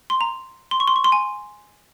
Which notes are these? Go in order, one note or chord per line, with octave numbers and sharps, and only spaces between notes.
C6
A#5
C6
C#6
C6
C#6
C6
G#5